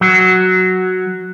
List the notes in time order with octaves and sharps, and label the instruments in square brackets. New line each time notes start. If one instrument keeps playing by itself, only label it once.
[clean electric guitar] F#3